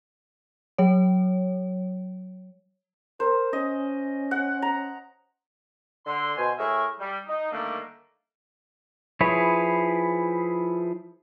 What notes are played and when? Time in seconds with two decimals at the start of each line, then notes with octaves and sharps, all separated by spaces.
0.78 F#3 C#5
3.20 A#4 C5
3.53 C#4 D#5
4.31 F#5
4.62 A#5
6.06 D3 C6
6.37 B2 C5 G#5
6.58 A2 G#4 A#4 E5 C#6 E6
7.00 G3
7.27 D#4
7.52 D3 D#3 G3 A3 A#3 D4
9.21 F3 E4 G#4 B4 C#5